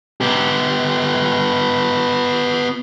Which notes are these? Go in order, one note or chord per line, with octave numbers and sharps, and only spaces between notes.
B3 G4